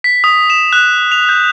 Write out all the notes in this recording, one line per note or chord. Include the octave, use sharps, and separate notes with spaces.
B6
D#6
E7
F#6
F7
G6